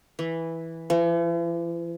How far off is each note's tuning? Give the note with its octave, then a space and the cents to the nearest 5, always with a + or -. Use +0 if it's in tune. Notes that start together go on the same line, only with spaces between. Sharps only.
E3 -5
E3 +45